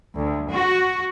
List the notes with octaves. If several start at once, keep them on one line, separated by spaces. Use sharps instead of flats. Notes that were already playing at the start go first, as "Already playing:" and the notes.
D2
F#4